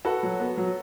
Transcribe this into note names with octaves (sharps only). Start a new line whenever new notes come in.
F#4 A4 B4
F#3
B3
F#3